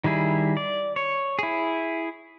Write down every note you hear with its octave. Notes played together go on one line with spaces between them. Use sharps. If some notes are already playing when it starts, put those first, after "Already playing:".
D#3 G3 E4 G#4
D5
C#5
E4 G#4